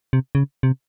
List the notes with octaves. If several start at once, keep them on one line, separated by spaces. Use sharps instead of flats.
C3
C#3
C3